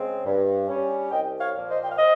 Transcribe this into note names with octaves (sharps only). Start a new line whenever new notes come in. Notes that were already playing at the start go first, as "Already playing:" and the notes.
Already playing: C#3 G#3 C4
G2
G3 C#4
C2 D#5 G5
C#5 F5
A#2 F3 A#3
C5 D#5
G5
F5
C5 D#5